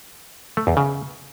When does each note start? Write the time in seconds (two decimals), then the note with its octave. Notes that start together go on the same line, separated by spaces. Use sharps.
0.57 A3
0.67 E2
0.77 C#3